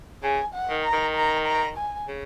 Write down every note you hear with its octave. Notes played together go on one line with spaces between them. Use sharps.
C#3 G#5
F#5
D#3
A#5
D#3
A#5
A#5
G#5
C#3